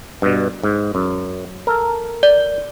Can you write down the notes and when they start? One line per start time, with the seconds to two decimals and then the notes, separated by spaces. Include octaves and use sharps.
0.22 G2 B2
0.63 G#2
0.95 F#2
1.67 A4 A#4
2.23 D5